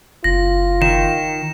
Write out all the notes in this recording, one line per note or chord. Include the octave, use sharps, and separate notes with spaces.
F#1 F4 A#6
D#3 E7